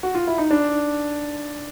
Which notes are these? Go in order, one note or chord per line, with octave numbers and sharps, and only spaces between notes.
F#4
F4
E4
D#4
D4